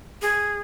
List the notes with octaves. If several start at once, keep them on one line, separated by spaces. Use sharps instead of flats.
G#4